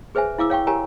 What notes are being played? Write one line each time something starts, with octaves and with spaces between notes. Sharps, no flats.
G#4 B4 C5 E5 G#5
E4 F5 D6 E6
C#5 F5 G5 C#6
G4 A#4 C#5 G#5 A#5